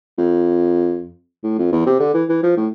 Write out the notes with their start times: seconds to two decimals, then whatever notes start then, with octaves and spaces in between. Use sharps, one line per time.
0.18 F2
1.44 A2
1.58 F2
1.72 E2
1.86 C3
2.00 D3
2.14 E3
2.29 E3
2.43 F3
2.57 A2